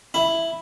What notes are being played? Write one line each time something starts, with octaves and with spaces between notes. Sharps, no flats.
E4